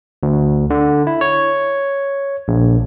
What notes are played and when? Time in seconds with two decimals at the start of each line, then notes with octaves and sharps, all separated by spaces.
0.23 D2
0.70 D3
1.07 E4
1.21 C#5
2.48 A#1